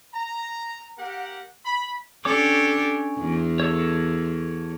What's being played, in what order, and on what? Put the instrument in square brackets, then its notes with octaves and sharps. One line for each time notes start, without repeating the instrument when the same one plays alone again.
[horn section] A#5
A#3 G4 A#4 F#5
B5
[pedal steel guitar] C#4 C#5 D6 [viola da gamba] D4 G4 A4
[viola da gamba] E2
[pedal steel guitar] A4 C#5